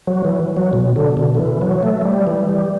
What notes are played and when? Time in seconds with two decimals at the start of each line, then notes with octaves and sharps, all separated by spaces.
0.07 F#3
0.25 E3
0.56 F#3
0.73 B2
0.96 D3
1.17 B2
1.35 D3
1.39 E3
1.61 F#3
1.83 A3
2.05 G3
2.27 E3
2.49 G3